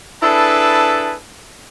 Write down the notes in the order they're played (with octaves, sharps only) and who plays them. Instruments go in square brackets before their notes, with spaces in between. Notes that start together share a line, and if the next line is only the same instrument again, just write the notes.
[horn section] D4 E4 G#4 A4 B4 A5